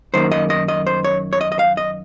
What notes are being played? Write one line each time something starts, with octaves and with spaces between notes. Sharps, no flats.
F#2 D#3 A#3 C5
D#5
D#5
D#5
C5
C#5
C#5
D#5
D#5
F5
D#5